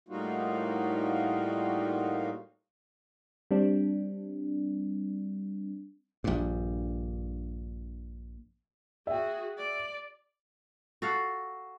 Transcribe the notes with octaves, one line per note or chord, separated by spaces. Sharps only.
A2 G3 A#3 D#4 F4 F#4
G3 C4 D4
A#1 G2
F#4 G#4 E5 G5
D5
F#4 A4 F5